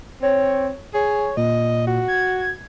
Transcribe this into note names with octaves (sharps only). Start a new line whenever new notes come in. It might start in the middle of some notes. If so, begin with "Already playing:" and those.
C4 C#5
G#4 C#5
A#2 D#5
F#4
G#6